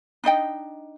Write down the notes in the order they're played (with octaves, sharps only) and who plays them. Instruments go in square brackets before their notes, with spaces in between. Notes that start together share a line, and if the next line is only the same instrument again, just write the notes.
[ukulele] D4 D#4 D#5 G5